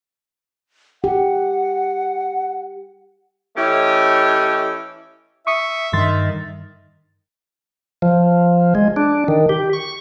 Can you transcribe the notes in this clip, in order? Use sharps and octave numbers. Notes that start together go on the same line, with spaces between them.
G4 F#5
E3 A3 C#4 G4 C#5 D#5
E5 C#6 D#6 C#7
G2 D#3 C6 A6
F3
G#3
D4
D#3
G4
C#6